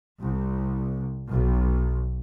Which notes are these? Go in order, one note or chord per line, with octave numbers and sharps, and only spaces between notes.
C2
B1